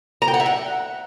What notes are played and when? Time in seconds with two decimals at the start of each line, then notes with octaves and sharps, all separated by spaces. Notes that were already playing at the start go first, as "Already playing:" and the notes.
0.22 A#5
0.28 G5
0.34 F#5
0.40 E5
0.46 F#5